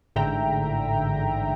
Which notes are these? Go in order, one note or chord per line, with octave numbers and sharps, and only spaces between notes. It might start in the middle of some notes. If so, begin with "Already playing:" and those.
A1 G#2 D3 E5 G5 A#5